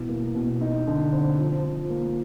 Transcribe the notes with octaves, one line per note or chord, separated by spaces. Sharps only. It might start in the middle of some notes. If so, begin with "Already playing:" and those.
Already playing: B2 E3
A#3
B2
D#4
D3
C4
F3
F3
A#3